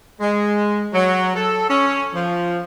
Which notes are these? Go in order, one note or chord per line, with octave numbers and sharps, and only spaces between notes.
G#3
F#3
A4
C#4
F3